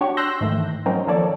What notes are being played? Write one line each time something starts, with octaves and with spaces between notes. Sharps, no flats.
D4 F#4 G4 C#5
C6 E6 F#6 G6 A#6
G#2 D#3 E3 A3
F#3 C4 C#4 D#4 A#4
D#3 F3 A#3 A4 C#5 D5